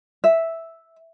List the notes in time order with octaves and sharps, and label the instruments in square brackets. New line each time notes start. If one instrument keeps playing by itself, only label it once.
[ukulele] E5